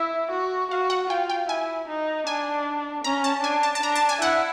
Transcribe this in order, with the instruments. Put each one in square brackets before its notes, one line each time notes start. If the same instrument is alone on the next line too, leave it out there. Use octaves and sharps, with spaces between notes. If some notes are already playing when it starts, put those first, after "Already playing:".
Already playing: [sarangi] E4 [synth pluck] E5
[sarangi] F#4
[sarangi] F#4 [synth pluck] F5
[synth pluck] F#5
[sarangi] F4 [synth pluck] G5
[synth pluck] G5
[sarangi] E4 [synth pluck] G#5
[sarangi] D#4
[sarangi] D4 [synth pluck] G#5
[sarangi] C#4 [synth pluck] A#5
[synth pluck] A5
[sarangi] D4 [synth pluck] G#5
[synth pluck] A5
A5
[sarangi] D4 [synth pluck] A#5
[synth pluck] A5
G#5
[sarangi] E4 [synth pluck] F#5